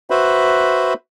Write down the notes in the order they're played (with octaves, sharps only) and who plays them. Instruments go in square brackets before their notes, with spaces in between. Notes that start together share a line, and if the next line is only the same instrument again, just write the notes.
[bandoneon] F#4 B4 C5 E5 B5